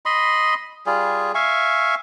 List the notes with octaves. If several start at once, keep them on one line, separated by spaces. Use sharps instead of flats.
D#5 B5 C6
G3 F4 G#4
E5 F5 G#5 C#6